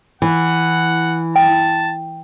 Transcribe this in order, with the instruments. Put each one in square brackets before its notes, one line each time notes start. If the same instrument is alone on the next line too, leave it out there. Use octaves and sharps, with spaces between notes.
[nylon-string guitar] E3 [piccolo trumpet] F#5
[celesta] G5 [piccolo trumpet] A5